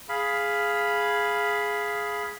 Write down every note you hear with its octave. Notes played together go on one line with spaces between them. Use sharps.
G#4 F5 B5